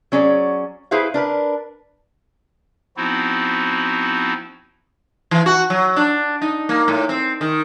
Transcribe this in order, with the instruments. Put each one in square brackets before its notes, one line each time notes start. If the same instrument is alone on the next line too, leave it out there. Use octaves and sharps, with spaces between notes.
[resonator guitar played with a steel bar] F#3 C#4 G#4 D5
E4 G#4 B4 C5 E5 F5
D4 A#4 B4
[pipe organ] F3 B3 C4 D#4 E4 F#4
[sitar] E3
F#4
F#3
D4
D#4
A#3
A2
C4
D#3